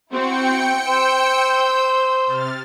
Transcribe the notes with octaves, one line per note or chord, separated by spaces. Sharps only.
C4 E4 F#4 G5 C#7
C5 E6 G6
C3 F6 A6